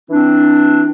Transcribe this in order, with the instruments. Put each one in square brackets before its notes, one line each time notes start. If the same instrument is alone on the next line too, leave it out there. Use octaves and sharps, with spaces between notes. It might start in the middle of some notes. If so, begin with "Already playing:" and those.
[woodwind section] E3 C4 D4